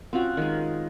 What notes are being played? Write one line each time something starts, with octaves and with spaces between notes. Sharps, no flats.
C4 C#4 F4 F#4
D#3 G#3